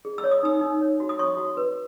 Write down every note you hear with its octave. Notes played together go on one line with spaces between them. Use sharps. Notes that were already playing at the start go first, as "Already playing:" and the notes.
G#4
E6
C#5
D#6
D#4 E6
D#4
C#5
F#4
D#6
C#5 C#6
F#4
B4